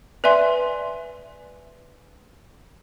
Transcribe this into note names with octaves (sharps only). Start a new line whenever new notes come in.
B4 D5 E5 G#5 C6